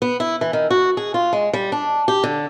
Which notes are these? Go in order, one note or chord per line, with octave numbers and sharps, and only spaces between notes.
B3
E4
E3
D#3
F#4
G#4
F4
G#3
G3
D4
G4
D3